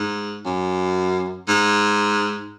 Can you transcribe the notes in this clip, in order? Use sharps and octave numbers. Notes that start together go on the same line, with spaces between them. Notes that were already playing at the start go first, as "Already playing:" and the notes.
Already playing: G#2
F#2
G#2